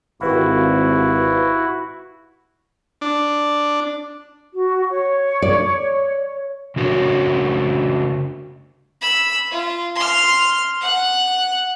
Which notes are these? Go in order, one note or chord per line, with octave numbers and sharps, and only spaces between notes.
G#1 E4 F#4 G4 B4 F5
D4
F#4
C#5
D5
C#3 D4 F#4 A#4 C#5
B5 E6
F4
C6 F6
F#5 F#6